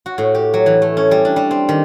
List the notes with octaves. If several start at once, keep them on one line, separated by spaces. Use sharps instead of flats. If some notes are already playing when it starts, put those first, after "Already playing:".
F#4
A2
G4
F#3
E3
A3
C#4
G3
D4
G3
C4
D#3